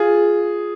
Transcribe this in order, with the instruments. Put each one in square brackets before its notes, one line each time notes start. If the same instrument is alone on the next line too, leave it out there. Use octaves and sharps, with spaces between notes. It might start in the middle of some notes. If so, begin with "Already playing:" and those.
Already playing: [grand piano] F4 G#4